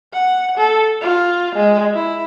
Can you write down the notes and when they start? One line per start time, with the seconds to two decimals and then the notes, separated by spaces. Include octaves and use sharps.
0.13 F#5
0.57 A4
1.02 F4
1.55 G#3
1.94 E4